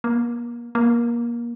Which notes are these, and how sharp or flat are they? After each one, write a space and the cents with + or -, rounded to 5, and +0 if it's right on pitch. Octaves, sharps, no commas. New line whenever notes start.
A#3 +35
A#3 +25